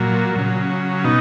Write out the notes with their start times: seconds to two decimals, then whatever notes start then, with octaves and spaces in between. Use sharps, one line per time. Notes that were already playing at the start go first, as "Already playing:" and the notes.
Already playing: A#2 F#3
0.35 C#3 F#3
1.04 B2 D#4